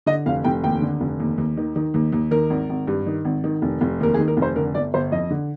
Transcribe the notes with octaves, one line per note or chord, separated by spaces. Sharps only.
D3 D#5
F1 F5
F1 G5
D#2 G5
D3
F1
D#2
D#2
D#3
D#3
D#2
D#2
D#3 A#4
G#1
G#1
G2
D#3
G#1
D#3
F1
F1
D#2 A#4
G#4
D#3
A#4
F1
C5
D3 A#4
G1 D5
G1 C5
F2 D#5
D3